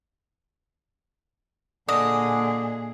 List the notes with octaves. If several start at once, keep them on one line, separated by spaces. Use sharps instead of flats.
A#2 D3 G#4 D#5